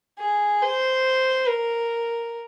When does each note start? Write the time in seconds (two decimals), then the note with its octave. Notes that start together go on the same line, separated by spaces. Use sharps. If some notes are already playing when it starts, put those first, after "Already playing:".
0.19 G#4
0.62 C5
1.48 A#4